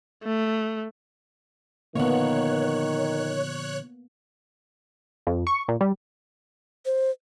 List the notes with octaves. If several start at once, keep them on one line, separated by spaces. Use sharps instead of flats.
A3
A#2 D3 D#3 F3 A#3 B3 C#5 F#6
F2
C#6
A#2
G3
C5